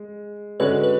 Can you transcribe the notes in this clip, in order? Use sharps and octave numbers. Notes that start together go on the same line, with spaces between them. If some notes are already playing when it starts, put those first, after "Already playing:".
Already playing: G#3
D3 G#3 C#4 F#4 B4 C#5
B4